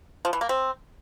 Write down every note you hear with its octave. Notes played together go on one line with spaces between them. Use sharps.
F3
E3
A#3
C4